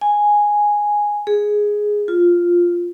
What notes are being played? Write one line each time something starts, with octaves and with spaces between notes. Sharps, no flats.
G#5
G#4
F4